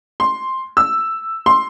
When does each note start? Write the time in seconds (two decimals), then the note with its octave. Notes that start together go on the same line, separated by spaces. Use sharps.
0.20 C6
0.77 E6
1.46 C6